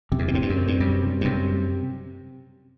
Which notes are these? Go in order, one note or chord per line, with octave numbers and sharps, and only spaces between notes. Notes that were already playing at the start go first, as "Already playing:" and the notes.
F#2 C3
E2
B2
A2 C3
G2
F#2
C4
G2
F#2 G3
C3
G2
F#2 C3